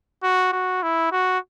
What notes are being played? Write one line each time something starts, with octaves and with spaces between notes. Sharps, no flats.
F#4
F#4
E4
F#4